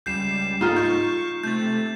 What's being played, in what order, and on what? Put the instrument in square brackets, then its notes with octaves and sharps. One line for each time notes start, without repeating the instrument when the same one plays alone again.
[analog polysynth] C#2 G3 [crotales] G6 C7 E7
[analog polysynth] G#2 A4 [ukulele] D#4 F4
[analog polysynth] C#6 [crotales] G6
[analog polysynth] C3 A3 [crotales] G6 A6